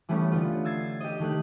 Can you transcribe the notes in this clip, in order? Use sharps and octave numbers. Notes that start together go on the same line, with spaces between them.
E3 G3 A3 B3 C#4
D3 B3 F4
E6 G#6 A6 C7
G4 D#5
D#3 A3 G4 F#6